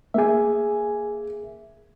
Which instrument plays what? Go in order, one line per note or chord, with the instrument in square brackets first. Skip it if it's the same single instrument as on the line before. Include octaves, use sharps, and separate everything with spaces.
[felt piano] A#3 G#5 [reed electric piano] G#4 E5